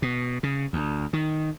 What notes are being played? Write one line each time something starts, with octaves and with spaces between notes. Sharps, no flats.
B2
C#3
D2
D#3